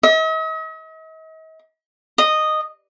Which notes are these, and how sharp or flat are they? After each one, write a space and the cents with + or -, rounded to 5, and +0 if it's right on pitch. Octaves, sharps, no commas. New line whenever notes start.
D#5 +45
D#5 -10